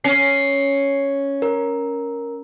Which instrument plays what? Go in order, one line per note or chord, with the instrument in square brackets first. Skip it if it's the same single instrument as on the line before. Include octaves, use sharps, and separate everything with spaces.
[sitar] C#4 [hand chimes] C7
[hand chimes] A#4